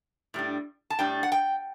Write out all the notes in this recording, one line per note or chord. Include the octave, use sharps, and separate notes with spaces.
A2 G3 D4
A5
A2 G3 D4 G5
F#5
G5